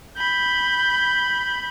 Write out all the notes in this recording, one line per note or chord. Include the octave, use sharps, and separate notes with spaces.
B5 G6